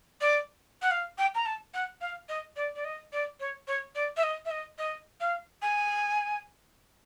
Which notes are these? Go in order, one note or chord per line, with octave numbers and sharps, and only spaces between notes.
D5
F#5
F5
G5
A#5
A5
F#5
F5
D#5
D5
D5
D#5
D5
C#5
C#5
D5
E5
D#5
E5
D#5
D#5
F5
G#5